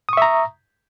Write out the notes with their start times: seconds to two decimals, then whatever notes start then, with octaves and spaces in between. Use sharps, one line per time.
0.09 D#6
0.13 C#6
0.17 E5
0.22 A#5